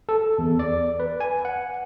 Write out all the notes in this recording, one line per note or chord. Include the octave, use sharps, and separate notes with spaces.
A4
E2
D5
B4
G#5
F#5